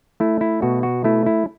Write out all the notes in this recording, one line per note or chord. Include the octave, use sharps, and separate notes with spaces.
A3 E4
E4
B2 F#4
F#4
A3 E4
E4